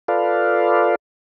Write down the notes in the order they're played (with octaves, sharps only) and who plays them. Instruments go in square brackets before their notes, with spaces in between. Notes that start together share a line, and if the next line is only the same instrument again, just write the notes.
[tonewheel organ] F4 A4 B4 D5 F5